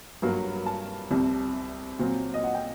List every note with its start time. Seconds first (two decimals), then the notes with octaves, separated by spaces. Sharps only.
0.22 G2 F#3 A#3
0.66 A5
1.10 C2 C3 G3
1.99 A#2 F#3 C4
2.34 D#5
2.44 F#5
2.55 G5